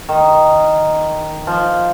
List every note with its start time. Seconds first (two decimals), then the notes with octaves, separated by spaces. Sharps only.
0.09 D#3
1.47 F3